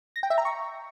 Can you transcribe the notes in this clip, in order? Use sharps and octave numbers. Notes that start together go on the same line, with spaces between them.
A#6
G5
E5
A#5
C#6